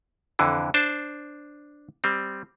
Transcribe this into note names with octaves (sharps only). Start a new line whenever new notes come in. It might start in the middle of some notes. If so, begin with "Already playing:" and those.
F2 D3 E3
D4 C5 A5
G3 C4